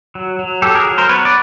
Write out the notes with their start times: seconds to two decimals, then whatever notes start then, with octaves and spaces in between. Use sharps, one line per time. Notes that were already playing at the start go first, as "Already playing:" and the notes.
0.15 F#3
0.39 F#3
0.62 F#3 G4 A4
0.75 G#4 A#4
0.86 F#3
0.98 A#4 C5
1.09 B3 B4 C#5
1.25 D5